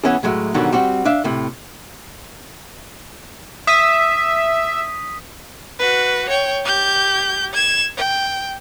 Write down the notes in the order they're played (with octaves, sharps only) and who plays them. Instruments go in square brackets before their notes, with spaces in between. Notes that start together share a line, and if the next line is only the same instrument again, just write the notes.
[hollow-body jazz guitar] E3 B3 C#4 E4 G#4
A2 F#3 G#3 A3
G#2 B2 D3 D#3 F#3 G3
G3 C4 F#4
D4 E5 F5
A2 C3
[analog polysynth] E5 [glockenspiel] D#6 B6 D#7
[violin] F#4 B4
C#5 G5
G4 G6
G#6 E7
G5